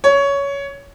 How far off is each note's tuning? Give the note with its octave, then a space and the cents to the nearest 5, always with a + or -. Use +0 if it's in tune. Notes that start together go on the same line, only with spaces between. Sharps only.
C#5 +15